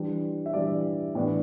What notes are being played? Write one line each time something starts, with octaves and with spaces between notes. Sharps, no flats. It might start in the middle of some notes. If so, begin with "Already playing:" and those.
Already playing: E3 G3 D4
E5
E3 G3 D4 D5
A2 E3 B3 D4